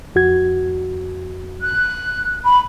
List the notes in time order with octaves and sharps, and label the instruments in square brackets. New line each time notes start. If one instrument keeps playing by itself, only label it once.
[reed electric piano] F2 F#4 G#6
[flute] F#6
B5